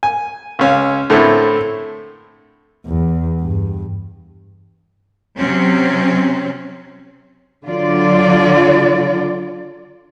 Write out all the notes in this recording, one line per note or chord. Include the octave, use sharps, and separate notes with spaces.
G#5
C#2 C#4 F5
A2 D3 A3 A#3 C4 E4
E2
G2
C3 F#3 C4 C#4
D3 F#3 F4 D5